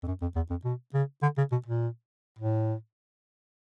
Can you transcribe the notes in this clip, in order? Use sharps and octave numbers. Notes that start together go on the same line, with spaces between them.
F2
F#2
F2
E2
F2
B2
C#3
D3
C#3
B2
A#2
A2